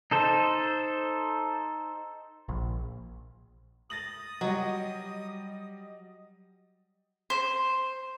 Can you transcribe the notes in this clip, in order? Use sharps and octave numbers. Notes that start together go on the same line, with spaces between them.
D#4 A4 C5
A#1
D#6 A6 A#6 F#7
F#3 G3 D#5
C5